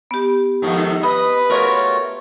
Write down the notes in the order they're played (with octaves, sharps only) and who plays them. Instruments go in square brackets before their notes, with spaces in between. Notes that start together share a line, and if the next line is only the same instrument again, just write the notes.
[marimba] B3 G4
[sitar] F2 G#2 D#3
[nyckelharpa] B4 [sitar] D#5 [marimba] B5
[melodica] A3 F4 F#4 [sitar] A#4 C#5